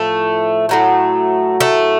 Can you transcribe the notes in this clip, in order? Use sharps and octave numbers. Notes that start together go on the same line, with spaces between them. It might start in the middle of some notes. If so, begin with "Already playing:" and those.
Already playing: A2 F3 A3
A2 F#3 A3
A3